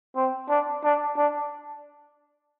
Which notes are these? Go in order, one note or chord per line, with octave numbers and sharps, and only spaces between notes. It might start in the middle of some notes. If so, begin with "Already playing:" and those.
C4
D4
D4
D4